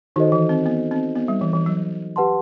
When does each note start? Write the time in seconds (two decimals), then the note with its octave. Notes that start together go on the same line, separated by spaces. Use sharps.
0.16 D#3 D#4 F#4 A4 C5 D#5
0.32 E3
0.49 C4
0.66 B3
0.91 C4
1.16 B3
1.28 G3
1.41 E3
1.53 E3
1.66 F#3
2.16 G4 B4 F#5 A5 C6